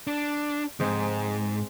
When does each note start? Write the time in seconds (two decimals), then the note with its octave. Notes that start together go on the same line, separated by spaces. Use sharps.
0.07 D4
0.80 G#2 G#3 C4